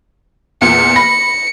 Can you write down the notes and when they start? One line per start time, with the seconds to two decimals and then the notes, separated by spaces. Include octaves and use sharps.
0.62 E2 A#2 C#7
0.96 B5 A#6